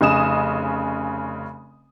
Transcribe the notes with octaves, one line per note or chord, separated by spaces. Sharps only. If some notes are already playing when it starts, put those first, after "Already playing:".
F1 C#3 D#5 G#5 D#6 E7